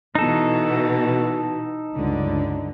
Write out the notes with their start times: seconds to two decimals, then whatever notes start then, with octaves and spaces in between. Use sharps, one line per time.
0.15 B2 E3 D#4 A4
1.94 C#2 G2 D3